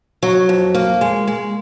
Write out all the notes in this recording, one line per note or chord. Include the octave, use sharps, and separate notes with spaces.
F#3
F2
A#3
G#3
G#3